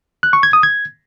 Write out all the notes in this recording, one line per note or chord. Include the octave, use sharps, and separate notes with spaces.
F#6
C#6
G#6
D#6
G#6